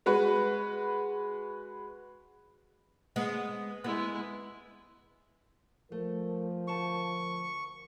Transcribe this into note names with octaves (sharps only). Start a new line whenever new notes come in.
G#3 F#4 B4
G#3 B3
G#3 B3 E4
F3 A3 A#4
D2 A#4 A5 C#6